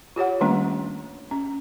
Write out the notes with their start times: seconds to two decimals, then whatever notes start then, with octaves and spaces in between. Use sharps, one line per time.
0.16 F4 G4 C#5 F#5
0.41 D#3 G3 A3 A#3 C#4 D4
1.31 C#4